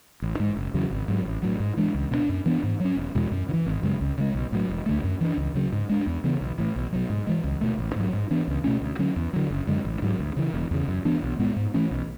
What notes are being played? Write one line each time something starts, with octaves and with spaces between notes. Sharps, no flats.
A1
G#2 G#3
F#1
E2 C#3 F#3
G#1
G#2 F#3
A1
A2 F#3
G#2
E3 G#3 D4
C#2
B2 G#3 D4
F#2
E3 B3 D4
G#2
F#3 C#4
E1
E2 B2 G#3
F#2
C#3
E3
G#1
F#2 C#3 G#3
C#2
C#3 G#3
B1
A2 F#3
E1
D2 D3 A3
F#2
E3 A3 D4
C#2
C#3 F#3
G#2
G#3 D4
E2
C#3 E3 B3
B1
A2 E3
B1
B2 F#3
G#2
E3 G#3
C#2
B2 A3
A1
G#2 F#3
G#2
E3 B3 D4
C#2
B2 A3 C#4
D2
D3 F#3 C#4
E2
D3 F#3
F#1
F#2 D3 G#3
A1
G#2 F#3
D2
C#3 E3
E1
E2 C#3
F#2
E3 B3 D4
B1
A2 G#3 B3
G#2
E3 A3 C#4
B1